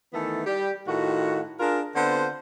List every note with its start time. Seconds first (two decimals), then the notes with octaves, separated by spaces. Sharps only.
0.14 D#3 E3 A3 B3 A4
0.47 G3 G4
0.88 A2 D#3 F4 F#4
1.60 D4 F4 G#4 A#4
1.96 D3 B3 C4 D4 F4 C5